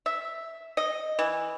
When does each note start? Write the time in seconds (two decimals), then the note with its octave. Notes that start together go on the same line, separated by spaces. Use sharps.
0.06 E5
0.77 D#5
1.19 E3